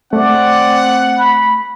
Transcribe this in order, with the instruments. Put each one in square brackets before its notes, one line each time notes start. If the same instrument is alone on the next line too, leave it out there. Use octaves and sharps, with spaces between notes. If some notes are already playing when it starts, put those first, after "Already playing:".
[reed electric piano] A3 [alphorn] C4 [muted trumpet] D5 [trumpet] F#5
[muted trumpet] B5